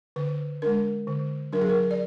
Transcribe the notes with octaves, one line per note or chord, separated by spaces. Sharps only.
D3 B4
G#3 D4 A#4
D3
F#3 D4 A#4
G#4
A#4
D5